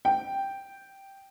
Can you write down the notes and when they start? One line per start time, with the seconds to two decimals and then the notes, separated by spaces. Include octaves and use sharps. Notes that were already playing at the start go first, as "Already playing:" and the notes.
0.05 G5